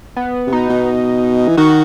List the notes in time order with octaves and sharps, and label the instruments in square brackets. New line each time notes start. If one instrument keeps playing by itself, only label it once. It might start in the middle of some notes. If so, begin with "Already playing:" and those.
[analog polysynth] B3
[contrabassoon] C3
[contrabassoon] B2 [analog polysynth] D#4
[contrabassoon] B2
E3
[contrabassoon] D#3 [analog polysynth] F#4